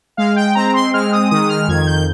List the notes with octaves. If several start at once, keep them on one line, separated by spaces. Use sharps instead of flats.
G#3 F5
G5
C4 A#5
C6
G#3 F6
D#6
D#3 D#6
F6
F2 G#6
G6